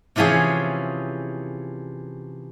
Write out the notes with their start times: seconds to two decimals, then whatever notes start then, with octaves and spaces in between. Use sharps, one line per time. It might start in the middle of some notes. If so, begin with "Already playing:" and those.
0.16 C3 E3 F3 C#4 G#4